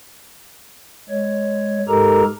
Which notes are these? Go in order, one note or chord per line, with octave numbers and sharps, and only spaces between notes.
G#3 C#5
G#2 G#3 G4 A4 A#4 A#5